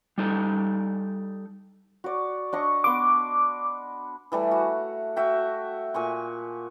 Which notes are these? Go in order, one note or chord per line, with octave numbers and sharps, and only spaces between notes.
G3 D#4 A4
F#4 D5
D4 D#5 C#6
B3 C6 D6
E3 G3 A3
F#4
F#4 E5 G5
A#2 G#5 C#6